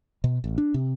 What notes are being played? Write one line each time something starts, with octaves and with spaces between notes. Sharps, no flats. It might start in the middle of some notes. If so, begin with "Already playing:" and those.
B2
A1
D4
C3